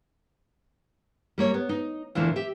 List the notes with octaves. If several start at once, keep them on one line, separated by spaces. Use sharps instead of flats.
G3 A#3 C#5
B3
D#4
E2 A#2 D3 E3 F3 A#3
G4 E5